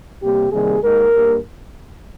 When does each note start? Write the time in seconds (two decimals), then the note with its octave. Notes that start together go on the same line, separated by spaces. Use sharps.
0.22 C3 G3 A#3 G4
0.52 C3 D#3 G3 A#3 G#4
0.82 D#2 D#3 G#3 A#4
1.13 G2 G3 A#3